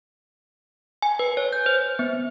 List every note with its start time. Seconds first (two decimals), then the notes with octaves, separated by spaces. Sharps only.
1.02 G#5
1.19 B4
1.37 C#5
1.52 G6
1.66 C5
1.99 B3